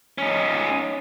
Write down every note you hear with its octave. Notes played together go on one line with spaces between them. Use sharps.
C#4 D#4